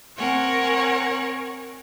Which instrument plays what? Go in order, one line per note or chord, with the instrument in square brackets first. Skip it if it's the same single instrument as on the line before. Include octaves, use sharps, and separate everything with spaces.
[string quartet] C4 A#4 C#5 F#5 G#5